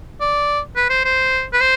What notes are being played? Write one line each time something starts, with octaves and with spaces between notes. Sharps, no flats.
D5
B4
C5
C5
B4
C5